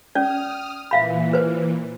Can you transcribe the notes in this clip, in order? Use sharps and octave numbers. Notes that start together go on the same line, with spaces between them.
C#4 D5 D#6 F6
A#2 E3 E5 F5 B5
B4 C5